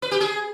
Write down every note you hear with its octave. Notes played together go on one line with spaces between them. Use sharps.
B4
G4
G#4